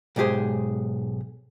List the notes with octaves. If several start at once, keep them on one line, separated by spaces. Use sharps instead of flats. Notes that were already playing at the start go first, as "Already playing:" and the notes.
B1 G#2 G#3 G4 G#4 C5